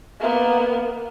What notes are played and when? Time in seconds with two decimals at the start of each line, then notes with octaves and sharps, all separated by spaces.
0.20 A#3 B3